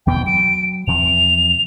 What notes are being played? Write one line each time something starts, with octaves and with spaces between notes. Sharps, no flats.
E2 B2 B3 G5
F#3 D7
E2 C3 F3 F7